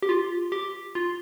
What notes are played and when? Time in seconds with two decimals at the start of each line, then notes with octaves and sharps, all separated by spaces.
0.02 G4
0.09 F4
0.52 G4
0.95 F4